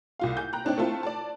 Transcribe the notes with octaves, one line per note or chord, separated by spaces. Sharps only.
C2 F4 F5
G#5 G6
G5 A#5 F#6
C4 D4 D#4 C#5 G5
A3 C4 E4 F4 A5
D5 A5